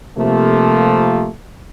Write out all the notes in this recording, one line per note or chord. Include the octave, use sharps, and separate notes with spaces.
C3 F3 A3 A#3